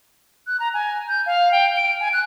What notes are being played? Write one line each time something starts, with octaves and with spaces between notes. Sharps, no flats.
F#6
A#5
G#5
G6
F5
G5
D7
G#5
F#6